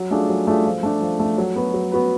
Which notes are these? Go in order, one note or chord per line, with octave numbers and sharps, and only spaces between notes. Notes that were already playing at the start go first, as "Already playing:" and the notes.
Already playing: F#3
A3 D4 F4 G#4
F#3
A3 D4 F4 G#4
F3
A3 D4
F3
A3 D4
F#3
B3 F#4 B4
F#3
B3 F#4 B4